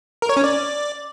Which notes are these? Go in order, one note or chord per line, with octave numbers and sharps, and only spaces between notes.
A#4
C#5
C#4
D5